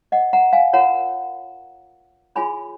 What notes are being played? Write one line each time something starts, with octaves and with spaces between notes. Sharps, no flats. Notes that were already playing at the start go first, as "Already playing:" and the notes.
D#5 F#5
F#5 A#5
F5 G#5
F4 A#4 C#5 F#5 A#5
F4 G#4 C#5 G#5 B5